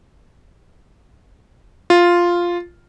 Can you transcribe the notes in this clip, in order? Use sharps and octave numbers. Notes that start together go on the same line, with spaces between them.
F4